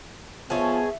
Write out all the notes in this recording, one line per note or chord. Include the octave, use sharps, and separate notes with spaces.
F3 B3 G#4 A4 C#5 E5